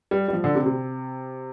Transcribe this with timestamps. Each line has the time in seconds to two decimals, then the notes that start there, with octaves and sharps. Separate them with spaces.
0.11 G3
0.28 G3
0.33 F3
0.44 D3
0.55 C3
0.66 C3